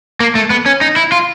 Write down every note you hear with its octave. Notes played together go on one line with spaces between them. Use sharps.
A#3
A3
B3
C#4
D#4
E4
F4